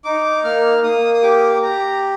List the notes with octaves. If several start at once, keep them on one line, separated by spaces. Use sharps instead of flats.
D#4 D6
A#3 F6
A#3 D#6
D#6
G4 D6
G4 A#5